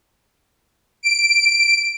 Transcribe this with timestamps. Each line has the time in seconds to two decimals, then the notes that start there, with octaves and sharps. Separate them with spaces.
1.03 D7